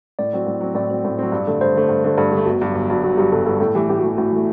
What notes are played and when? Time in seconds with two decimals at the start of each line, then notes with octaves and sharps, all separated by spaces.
0.19 A2 D5
0.33 F#3 C4
0.47 A2
0.61 F#3 C4
0.75 A2 D5
0.90 F#3 C4
1.05 A2
1.19 F#3 C4
1.32 G2
1.47 D3 A3
1.61 G2 C5
1.76 D3 A3
1.89 G2
2.04 D3 A3
2.18 G2 A4
2.32 D3 A3 G4
2.46 G1 F#4
2.61 G2 F#3
2.75 G1
2.90 G2 F#3
3.04 G1 F#4
3.18 G2 F#3 G4
3.32 G1 A4
3.46 G2 F#3 A4
3.60 A2 A4
3.75 E3 A3 G4
3.90 A2 G4
3.98 F#4
4.03 E3 A3
4.17 A2 F#4
4.32 E3 A3